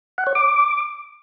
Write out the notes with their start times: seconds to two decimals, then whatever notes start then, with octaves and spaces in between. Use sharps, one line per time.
0.18 F#5
0.27 C#5
0.35 D6